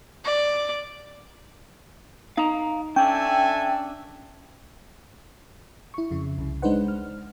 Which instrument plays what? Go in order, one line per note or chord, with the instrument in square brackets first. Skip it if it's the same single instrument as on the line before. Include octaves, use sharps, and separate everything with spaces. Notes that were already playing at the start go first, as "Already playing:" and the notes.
[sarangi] D5
[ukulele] D#4 [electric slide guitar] F5 A#5
[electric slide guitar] C#4 D4 [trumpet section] A4 E5 G#5 [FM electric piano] G5
[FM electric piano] E4 C#6
F2 C#3 E4
C2 C#3
G#3 D4 D#4 B4 C5 F#5
F6